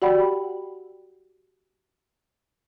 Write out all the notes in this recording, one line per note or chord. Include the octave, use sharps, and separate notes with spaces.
F#4 G4 D5 F#5 G5 B5